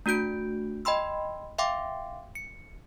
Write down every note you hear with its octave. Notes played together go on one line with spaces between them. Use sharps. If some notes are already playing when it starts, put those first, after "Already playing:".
A3 D4 F#4 G6 D7
D#5 G5 B5 C6 E6
E5 F5 G5 C6 D6
C#7